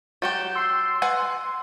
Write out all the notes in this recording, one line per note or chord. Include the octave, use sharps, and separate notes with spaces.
F#3 F#4 G4 G6 A6 D7 E7
C6 E6
B4 F#5 G#5